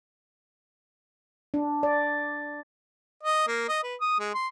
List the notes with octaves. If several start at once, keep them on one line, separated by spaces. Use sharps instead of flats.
D4
D5
D#5
A#3
D#5
B4
D#6
G#3
C6